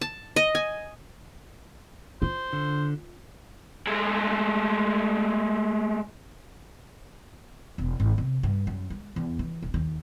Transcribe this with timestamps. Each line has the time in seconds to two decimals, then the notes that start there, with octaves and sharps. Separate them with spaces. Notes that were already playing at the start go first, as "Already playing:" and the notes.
0.01 A5
0.36 D#5
0.55 G#5
2.22 F4 C5
2.53 D3
3.87 G#3 A3
7.78 E1
8.00 G#1
8.18 C3
8.43 G2
8.67 F#2
8.90 G#3
9.16 E2
9.39 E3
9.63 D#1
9.74 D#2